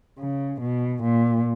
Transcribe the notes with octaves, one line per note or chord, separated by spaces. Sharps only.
C#3
B2
A#2